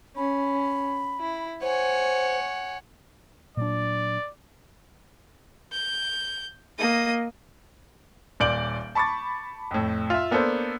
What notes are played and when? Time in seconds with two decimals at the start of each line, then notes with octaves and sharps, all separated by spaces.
0.17 C#4 B5
1.20 E4
1.62 C5 C#5 F#5 G#5
3.57 A#2 F#3 D4 D5
5.73 G6
6.79 A#3 D#5 D#6
8.40 D#1 A#2 D5 G6 D7 F#7
8.95 A5 B5 C#6 D6 A6
9.71 F2 A2
10.10 F4 E5
10.31 A#3 B3 D4 A4 C5